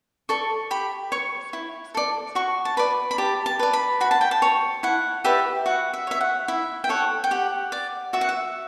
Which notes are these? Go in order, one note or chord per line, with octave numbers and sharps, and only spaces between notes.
A4 D5 C#6
G4 B5
C#5 C#6
E4
A4 D5
F#4 C#6
A5
B4 D5 B5
B5
G4 A5
A5
B4 D5
B5
F#4 B5
A5
G5
A5
C#5
E4 F#5
G4 B4 D5 E5
F#4 F#5
E5
C#5 E5
F#5
E4 E5
G5
A4 C#5 F#5
G5
G4 F#5
D5
F#4 E5
F#5
E5